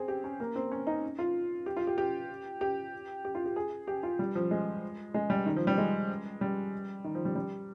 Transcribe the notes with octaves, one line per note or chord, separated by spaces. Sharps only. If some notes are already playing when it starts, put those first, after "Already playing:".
Already playing: C4 G#4
G4
C#4
A#3
C4
C#4
D#4
F4
G4
F4
G4
G4
G4
G4
F4
G4
G#4
G4
F4
G3
F3
G#3
G#3
G3
D#3
F3
G3
G#3
G3
D#3
F3
G3
G3